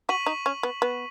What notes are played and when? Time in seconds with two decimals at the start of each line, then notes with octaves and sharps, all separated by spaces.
0.09 F#4 C#6 B6 D#7 F#7
0.26 D#4
0.46 C#4
0.63 B3
0.82 B3